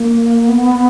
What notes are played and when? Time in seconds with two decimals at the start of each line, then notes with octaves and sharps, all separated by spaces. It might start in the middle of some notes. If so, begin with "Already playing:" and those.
Already playing: A#3
0.47 B3